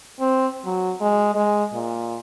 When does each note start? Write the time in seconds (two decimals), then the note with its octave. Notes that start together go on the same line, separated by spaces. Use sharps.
0.20 C4
0.65 F#3
1.00 G#3
1.35 G#3
1.73 A#2